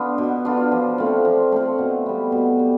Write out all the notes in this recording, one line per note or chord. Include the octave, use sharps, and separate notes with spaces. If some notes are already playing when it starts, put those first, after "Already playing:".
Already playing: B3 D4 F4
B2
B3 D4 F4
F3
A3 C4 F4
F3
A3 C4 F4
B2
G3 B3
B2
G3